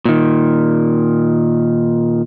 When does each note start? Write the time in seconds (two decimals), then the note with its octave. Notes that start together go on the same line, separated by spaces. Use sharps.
0.05 A#2 D#3